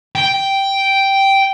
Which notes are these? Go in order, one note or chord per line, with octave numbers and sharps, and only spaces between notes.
G5